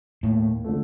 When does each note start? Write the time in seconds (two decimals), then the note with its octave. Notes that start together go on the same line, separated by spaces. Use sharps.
0.23 D#2 A2
0.64 D3 F3 A3